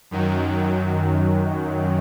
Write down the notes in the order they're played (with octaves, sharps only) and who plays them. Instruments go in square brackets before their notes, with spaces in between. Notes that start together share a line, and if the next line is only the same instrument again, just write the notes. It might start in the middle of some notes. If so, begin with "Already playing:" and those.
[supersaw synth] F#2 D#3 F#3